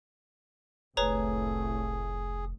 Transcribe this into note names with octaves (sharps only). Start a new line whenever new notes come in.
F1 C2 A2 A3 G#4 B4 C#5 A#5